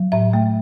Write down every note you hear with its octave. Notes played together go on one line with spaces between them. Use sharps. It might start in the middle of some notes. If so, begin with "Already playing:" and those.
Already playing: F#3
A2 E5
A3